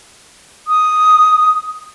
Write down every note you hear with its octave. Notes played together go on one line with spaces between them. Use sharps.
D#6